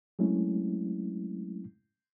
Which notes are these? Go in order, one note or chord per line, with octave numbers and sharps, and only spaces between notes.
F#3 G#3 A3 C4 C#4 E4